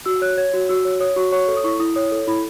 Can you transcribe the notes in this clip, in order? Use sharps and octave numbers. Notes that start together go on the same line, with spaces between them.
F#4 E6
C#5 F#6
C#5 G#6
F#4
F#4 E6
C#5
C#5 D#6
F#4 C#6
C#5 C#6
A4
D#6
E4 C#6
E4 D#6
C#5 D#6
A4
E4 B5